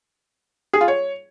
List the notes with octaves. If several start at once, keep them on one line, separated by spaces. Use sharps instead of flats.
G#4
F4
C#5